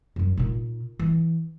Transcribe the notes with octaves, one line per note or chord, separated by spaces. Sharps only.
F#2 F#3
A#2 D#4
E3